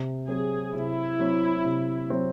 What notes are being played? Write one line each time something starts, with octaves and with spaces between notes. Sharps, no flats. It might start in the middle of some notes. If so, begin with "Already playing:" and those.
Already playing: C3
F#3 C4 G#4
C3 E4
F#3 C4
C3
F#3 C4